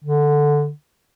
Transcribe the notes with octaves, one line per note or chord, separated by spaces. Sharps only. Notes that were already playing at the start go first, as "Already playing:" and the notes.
D3